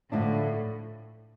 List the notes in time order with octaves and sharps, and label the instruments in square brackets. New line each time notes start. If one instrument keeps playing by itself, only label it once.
[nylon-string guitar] D2 D3 F3 A3 D4 [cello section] A2